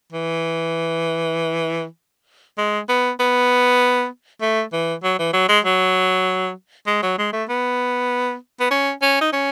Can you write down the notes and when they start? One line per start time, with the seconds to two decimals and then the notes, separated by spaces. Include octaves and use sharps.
0.12 E3
2.58 G#3
2.89 B3
3.20 B3
4.41 A3
4.73 E3
5.03 F#3
5.19 E3
5.33 F#3
5.48 G#3
5.64 F#3
6.87 G#3
7.02 F#3
7.18 G#3
7.33 A3
7.49 B3
8.60 B3
8.71 C#4
9.02 C#4
9.21 D#4
9.33 C#4